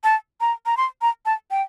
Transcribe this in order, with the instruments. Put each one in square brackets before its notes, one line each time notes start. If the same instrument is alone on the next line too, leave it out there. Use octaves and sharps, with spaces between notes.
[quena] A5
A#5
A#5
C6
A#5
A5
G5